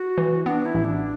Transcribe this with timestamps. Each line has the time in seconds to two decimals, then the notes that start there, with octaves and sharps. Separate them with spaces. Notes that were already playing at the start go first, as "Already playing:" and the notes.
Already playing: F#4
0.18 E3
0.46 B3 D4
0.66 E4
0.75 A1
0.85 D4